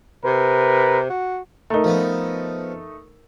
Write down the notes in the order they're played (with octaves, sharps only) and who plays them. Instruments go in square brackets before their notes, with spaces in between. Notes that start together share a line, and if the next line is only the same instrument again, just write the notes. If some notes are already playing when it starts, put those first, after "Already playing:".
[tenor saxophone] C3 [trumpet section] A#4 B4
[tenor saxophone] F#4
[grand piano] A3 D#4 [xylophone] A#4 A#5
[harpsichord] F3 B3